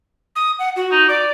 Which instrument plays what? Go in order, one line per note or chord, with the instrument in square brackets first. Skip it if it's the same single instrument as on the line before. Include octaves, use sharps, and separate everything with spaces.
[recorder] D#6
F#5
F#4
[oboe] D#4
[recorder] D5 [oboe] D6